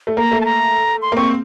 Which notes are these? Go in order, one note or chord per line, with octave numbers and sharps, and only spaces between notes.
A3
A#3 A#5
A3
A5
A#5
C6
A#3
C4 C#6